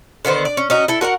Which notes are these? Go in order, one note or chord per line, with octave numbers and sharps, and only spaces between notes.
D3 D#3 B3 C5
D5
C#4
C#4 D#4 F#4
E4 A4
F#4 A#4 C#5 F#5